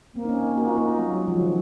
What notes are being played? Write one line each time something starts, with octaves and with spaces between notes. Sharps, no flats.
A#3 C4
D#4
C#4
D#4
F#4
F4
D#4
F4
F#3
G#3
F3
D#3